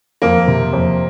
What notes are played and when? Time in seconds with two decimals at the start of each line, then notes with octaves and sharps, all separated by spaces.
0.22 F2 A#3
0.48 C3
0.73 F2